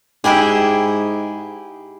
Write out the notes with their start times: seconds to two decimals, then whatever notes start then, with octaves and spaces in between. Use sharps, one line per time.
0.24 G#2 E4 G4 G#4